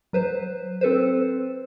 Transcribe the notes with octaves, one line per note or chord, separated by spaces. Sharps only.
F#3 B4 C5
C4 A4 B4 C5